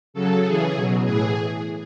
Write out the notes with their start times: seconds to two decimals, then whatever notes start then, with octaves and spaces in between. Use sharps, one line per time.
0.14 C#3 F#3 A4
0.43 C#3 E3 G#4
0.75 B2 F#3
1.04 A2 E3 G#4